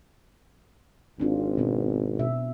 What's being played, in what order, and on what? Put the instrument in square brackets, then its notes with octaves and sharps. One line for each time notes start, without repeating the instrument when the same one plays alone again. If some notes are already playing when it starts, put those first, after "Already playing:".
[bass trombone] G#1 [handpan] C4 D4 F4
[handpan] B2 B3 C#4
B2 E5